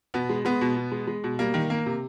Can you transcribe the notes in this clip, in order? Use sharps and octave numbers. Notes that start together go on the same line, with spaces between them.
B2 B3
G#3
G#3 B3
B2
B2
G#3
G#3
B2
G3 A#3
D#3
A#3
C3